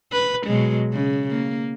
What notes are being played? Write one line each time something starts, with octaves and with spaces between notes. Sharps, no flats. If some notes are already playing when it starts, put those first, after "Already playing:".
B4
B2 F#3 G#3
C#3
A#3